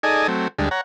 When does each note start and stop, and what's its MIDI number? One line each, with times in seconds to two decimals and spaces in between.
0.03 0.27 63
0.03 0.27 68
0.03 0.27 69
0.03 0.27 74
0.03 0.27 75
0.03 0.27 80
0.28 0.48 54
0.28 0.48 57
0.28 0.48 60
0.59 0.69 38
0.59 0.69 55
0.59 0.69 56
0.59 0.69 62
0.71 0.81 73
0.71 0.81 78
0.71 0.81 82